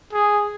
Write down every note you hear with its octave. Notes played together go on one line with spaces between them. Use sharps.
G#4